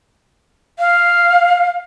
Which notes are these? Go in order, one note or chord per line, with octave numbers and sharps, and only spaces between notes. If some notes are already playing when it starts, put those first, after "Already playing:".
F5